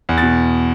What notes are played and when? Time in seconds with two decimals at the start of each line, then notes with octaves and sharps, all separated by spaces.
0.09 E2
0.18 A6
0.23 B2